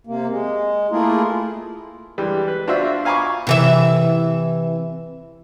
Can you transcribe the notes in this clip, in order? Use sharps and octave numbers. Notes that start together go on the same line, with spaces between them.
C3 A#3
G#3
A3 A#3 E4 F4 G#4 A#4
E3 G3 G#3
B4
D4 F4 F#4 C5 E5
F5 G#5 A#5 B5 C#6 D6
C3 E3 E5